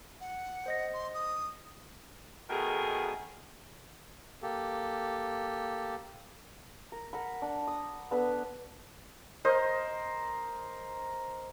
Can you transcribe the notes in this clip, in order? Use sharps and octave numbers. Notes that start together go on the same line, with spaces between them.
F#5
C5 D#5 A#6
C6
D#6
B2 D#3 A3 G#4 A#4
A#3 G4 A4
A#4
A#4 F#5 B5
D4
D#6
B3 D4 A4 B4
A#4 C5 D#5